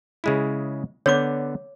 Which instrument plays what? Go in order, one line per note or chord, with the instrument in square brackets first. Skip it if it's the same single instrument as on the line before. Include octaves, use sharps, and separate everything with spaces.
[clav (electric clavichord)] C#3 G#3 E4
[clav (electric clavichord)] D3 B3 [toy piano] C#5 D6